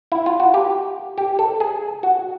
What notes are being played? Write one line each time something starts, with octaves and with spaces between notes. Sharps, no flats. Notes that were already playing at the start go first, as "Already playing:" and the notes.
E4
F4
F#4
G4
G4
A4
G#4
F#4